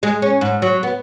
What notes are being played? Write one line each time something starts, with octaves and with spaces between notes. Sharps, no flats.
G#3
C#4
G#2
F#3
B3